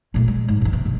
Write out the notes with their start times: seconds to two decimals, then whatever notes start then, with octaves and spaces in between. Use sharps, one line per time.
0.14 A#2 A3
0.28 G#3
0.48 G#2
0.61 G2 D#3
0.73 C3
0.85 G1 G#2